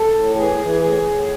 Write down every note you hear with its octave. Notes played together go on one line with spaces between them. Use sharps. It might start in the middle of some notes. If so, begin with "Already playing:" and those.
Already playing: A4
A2
E3 G#4
E3
A2 G#4
A2